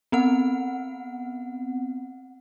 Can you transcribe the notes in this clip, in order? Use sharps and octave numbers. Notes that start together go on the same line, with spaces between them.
B3 C4 F#5